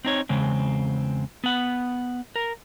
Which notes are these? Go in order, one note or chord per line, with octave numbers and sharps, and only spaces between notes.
C4 D#4 C#5
E2 C#3 G#3 C4
B3 F#5
A#4